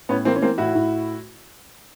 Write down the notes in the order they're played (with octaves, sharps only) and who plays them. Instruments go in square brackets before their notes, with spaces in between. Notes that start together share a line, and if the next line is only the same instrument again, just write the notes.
[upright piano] A2 B3 C#4
E3 A#3 C4
C#4
E3 A#3 C4
A2 E4 F#4
A2